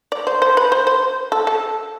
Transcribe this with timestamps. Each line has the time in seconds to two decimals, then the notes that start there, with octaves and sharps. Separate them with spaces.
0.12 D5
0.27 C5
0.42 C5
0.57 B4
0.72 C5
0.87 C5
1.32 A4
1.47 A4